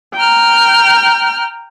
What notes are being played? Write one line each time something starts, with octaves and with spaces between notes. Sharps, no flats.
G5 A#5 F6